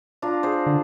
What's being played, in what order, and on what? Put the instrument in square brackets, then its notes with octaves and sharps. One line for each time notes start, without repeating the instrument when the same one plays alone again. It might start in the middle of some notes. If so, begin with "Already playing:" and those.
[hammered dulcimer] D4 F4 A#4
G#4 C5
[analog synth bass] D3